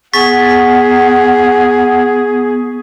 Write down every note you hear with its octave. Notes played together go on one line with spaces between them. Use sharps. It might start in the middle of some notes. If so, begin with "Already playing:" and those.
B3 G#4 F#5 C#6 A6 B6